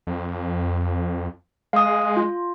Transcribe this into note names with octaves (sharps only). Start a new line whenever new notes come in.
F2
G#3 F5 D#6
F4